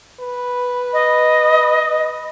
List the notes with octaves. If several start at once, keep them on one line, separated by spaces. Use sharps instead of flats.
B4
D#5